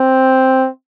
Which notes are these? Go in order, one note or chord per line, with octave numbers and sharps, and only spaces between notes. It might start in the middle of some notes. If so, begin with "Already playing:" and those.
Already playing: C4